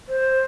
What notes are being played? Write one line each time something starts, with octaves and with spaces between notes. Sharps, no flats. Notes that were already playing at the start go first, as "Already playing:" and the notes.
C5